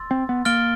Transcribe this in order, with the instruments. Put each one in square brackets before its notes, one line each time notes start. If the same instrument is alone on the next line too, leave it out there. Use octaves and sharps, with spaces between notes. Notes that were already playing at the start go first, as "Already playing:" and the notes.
Already playing: [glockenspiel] C6 E6 A6
[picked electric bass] C4
B3
[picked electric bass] A#3 [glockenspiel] F6 A6 D7 G7